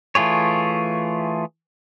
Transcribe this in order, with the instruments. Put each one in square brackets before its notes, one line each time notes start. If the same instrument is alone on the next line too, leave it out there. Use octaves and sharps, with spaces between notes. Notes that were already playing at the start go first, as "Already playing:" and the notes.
[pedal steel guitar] E3 A3 F4 G#4 C#5